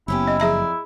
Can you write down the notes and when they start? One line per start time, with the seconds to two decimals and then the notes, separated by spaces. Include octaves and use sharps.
0.08 F#1 B3 C#4 E4 G4
0.28 D#5
0.40 F2 G#4 D5 E5 A#5